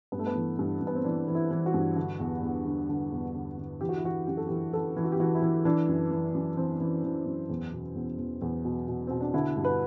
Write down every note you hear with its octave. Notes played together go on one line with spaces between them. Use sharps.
G2 B3
A3
B3
E3
G2
G2
B3
C4
E3 D4
E3
E4
E3
F#4
G2
D3
E2
E2
D3
D3
E2
D3
D3
E3 G4
F#4
E4
E3 F#4
F#2 G4
A4
E3 G4
E3 A4
E3
F#4
G4
E3 F#4
E4
E3
E3 D4
F#2
E3
F#2
E3 C4
E3
E3
F#2
E2
B2
E2
E2
E2
B2
B2
B2 C4
D4
D3 E4
G2
B4